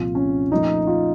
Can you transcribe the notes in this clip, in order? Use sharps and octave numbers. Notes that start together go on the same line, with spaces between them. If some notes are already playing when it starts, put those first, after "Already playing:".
Already playing: C2 A#2 F3 F4
C#4
A#2 F3 A3 D#4
F4